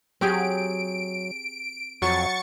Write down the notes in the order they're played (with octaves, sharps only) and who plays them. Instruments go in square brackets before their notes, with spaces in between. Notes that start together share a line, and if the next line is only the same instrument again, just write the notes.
[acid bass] F#3 [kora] C4 G4 G#4 [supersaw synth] D7
[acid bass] F2 [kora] F#3 [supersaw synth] C#6 A6 C#7